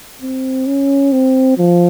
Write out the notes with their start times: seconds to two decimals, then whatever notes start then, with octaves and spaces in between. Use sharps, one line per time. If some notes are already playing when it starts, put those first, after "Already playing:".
0.22 C4
0.67 C#4
1.12 C4
1.58 F3